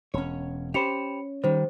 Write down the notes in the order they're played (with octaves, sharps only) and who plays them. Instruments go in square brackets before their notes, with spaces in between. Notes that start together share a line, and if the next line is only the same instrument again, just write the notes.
[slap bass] E1 [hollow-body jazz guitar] C#4 C#5
[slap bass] C#4 [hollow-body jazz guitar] G4 C5 [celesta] B5 C#7 F7
[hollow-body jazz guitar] D#3 G3 [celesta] C5